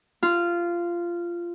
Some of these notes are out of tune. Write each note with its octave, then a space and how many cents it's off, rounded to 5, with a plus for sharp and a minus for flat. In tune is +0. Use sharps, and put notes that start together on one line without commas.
F4 -15